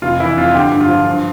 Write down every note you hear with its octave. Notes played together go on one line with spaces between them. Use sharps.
F1 F4
E3 E4
F2 F4
D3 G4
G2
F4
F3
G2